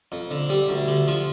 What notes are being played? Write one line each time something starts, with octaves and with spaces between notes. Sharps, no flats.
F2
D3
G3
D2
D3
F3